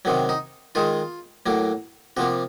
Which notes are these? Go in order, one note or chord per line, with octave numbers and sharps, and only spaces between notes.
C3 D#3 F#3
D#4
D#3 G#3 F4
A2 F#3 A#3
C3 F3 A#3 F#4